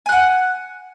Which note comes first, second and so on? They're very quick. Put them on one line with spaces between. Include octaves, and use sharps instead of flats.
G#5 F#6 F#5